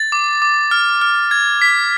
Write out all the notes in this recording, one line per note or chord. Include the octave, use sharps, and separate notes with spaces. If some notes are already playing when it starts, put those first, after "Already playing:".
Already playing: A6
D6
D6
F6
F6
G#6
B6